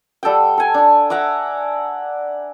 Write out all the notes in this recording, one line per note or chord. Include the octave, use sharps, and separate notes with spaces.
G3 A4 F#5 G5
A4 G#5
D4 D5
E5 F#5 A#5 D6